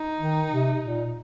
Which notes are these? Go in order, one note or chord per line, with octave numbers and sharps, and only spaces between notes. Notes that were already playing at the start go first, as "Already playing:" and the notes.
Already playing: D#4
D#3
C3
A#2